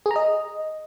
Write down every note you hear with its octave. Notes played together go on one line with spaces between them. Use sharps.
G#4
A#5
D#5